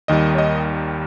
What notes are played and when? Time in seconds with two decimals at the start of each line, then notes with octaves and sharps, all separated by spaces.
0.08 D#2 D#3 G3 D#5
0.35 C#5
0.38 D#5